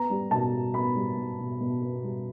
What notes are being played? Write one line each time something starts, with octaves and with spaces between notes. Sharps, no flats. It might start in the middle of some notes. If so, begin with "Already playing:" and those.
Already playing: B3 A#5
G3
B2 A5
G3
B3 B5
G3
B2
B2
B2
B3
G3